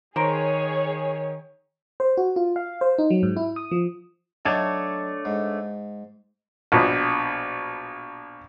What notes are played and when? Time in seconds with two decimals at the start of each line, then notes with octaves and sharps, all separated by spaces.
0.16 D#3 G#4 A#4 C5 C#5
2.00 C5
2.17 F#4
2.36 F4
2.56 F5
2.81 C5
2.98 D#4
3.11 F#3
3.23 G#2
3.37 E4
3.56 D#6
3.71 F3
4.45 F#3 A3 D4 D#4 C#5 A5
5.25 G#2
6.72 A#1 B2